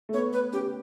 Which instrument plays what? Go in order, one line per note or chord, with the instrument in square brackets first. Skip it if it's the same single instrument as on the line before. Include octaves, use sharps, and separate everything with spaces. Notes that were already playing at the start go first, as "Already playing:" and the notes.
[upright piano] A3
[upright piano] B3 [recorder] C#5
[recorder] B4
[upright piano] C#4 [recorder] G4